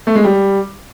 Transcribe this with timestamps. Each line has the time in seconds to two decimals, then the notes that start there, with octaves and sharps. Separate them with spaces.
0.07 A3
0.15 G#3
0.24 G3